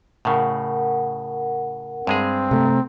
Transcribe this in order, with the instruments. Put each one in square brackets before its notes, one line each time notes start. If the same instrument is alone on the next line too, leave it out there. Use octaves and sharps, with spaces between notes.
[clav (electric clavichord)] A2 C#3 [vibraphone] A#4 F#5
[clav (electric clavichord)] G2 G#3 G#4 [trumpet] C4
[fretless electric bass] C3 A3 [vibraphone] A#5